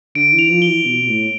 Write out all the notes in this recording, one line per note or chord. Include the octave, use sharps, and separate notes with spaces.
D3 D7
E3
F7
F3
G7
E3
B2
B2
A2